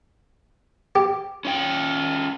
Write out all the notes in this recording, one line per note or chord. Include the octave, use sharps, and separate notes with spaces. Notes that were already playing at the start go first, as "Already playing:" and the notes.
G4
C#4 F4 G5